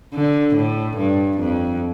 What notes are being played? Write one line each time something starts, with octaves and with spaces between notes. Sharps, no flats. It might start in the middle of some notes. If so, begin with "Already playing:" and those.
D3
A2
G2
F2